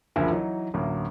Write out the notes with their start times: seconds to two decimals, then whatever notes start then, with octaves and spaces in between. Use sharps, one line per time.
0.16 F#1 D2 D3 F3 G#5
0.30 E3 F#3 D#4
0.74 A1 D2 F#3 A#3